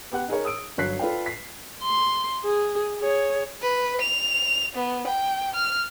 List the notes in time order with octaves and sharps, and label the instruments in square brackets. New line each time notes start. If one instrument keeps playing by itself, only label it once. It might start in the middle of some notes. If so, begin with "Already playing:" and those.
[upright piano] B3 G4 F#5 F#6
D#4 G#4 A#4 C#5
D#6 E6 D7
G1 F#3 C#5 F#6 B6 C7
F4 A4 B4 D5 F5 G5
B6 C7
[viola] C6
G#4
G#4 C#5
[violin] B4
F7
B3
G5
F6